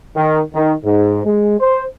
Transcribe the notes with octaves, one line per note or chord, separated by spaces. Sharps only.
D#3
D#3
G#2
G#3
C5